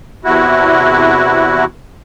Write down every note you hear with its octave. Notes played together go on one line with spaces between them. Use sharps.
E2 C3 E4 F#4